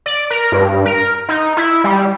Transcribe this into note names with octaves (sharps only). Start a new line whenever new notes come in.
D5
A#4
G2
A#4
D#4
E4
G3